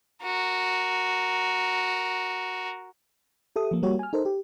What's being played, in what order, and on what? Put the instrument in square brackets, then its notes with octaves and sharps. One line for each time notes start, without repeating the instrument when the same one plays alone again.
[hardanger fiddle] F#4 A#4
[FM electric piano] G4 A4 E5 D#6
F3 A#3
G3 A#3 F#4 G4 C#5
G#5 F6
D#4 A4 A#4 C5
G4